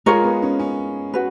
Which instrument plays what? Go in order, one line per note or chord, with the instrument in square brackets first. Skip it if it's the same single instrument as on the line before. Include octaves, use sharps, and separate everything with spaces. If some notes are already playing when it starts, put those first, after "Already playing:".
[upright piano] G#3 [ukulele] F4 A#4 C#5
[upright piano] B3
C#4
C#4
[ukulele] F#4 B4